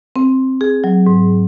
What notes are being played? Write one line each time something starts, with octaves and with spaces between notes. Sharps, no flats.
C4
G#4
F#3
G#2